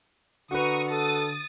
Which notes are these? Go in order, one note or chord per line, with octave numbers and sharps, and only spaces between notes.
D3 F#4 B4 A#5 C#6 D#6
A4 D#6 A6